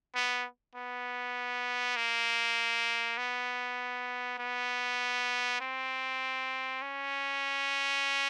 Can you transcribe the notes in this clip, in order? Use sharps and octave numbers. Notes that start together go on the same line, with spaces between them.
B3
B3
A#3
B3
B3
C4
C#4